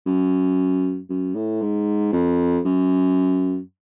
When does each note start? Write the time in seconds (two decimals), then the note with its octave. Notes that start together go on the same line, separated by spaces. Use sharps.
0.06 F#2
1.10 F#2
1.35 A2
1.62 G#2
2.13 F2
2.65 F#2